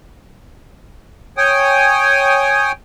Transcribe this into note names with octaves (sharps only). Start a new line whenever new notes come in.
C#5 G5 G#5 D#6